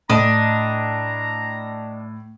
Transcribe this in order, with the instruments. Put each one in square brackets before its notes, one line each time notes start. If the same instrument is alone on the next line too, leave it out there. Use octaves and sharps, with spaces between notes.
[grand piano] A2 [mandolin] D4 D#5 [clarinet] A#5